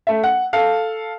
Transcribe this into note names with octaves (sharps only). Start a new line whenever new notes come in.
A3 E5
F#5
A4 F5